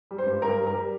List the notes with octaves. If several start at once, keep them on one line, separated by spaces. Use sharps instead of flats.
G3
C5
G2
G2 A#4
G3
A#4
G3